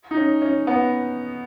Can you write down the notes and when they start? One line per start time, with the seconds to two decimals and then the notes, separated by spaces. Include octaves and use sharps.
0.11 D#4
0.17 C#4
0.42 C#4
0.67 B3